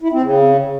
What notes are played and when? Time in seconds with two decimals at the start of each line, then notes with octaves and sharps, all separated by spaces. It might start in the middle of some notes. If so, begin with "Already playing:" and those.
0.02 E4
0.12 C4
0.22 C#3